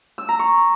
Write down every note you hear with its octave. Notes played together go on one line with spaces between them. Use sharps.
E6
A#5
C#6